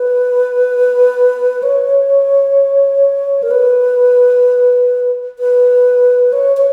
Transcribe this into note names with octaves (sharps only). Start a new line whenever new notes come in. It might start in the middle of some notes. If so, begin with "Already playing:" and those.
Already playing: B4
C#5
A#4
B4
B4
C#5
C#5